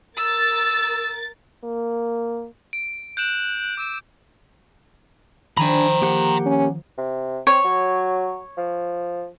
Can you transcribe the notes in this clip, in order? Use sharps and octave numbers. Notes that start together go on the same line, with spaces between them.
A#4 E6 A6
A#3
D7
F#6 G6 D7 E7
D6 E6
D#3 F3 D4 C5 G5 G#5 A#5 B5
A#3 G4 F#5
C#4
C3
C4 C#5
F#3
F3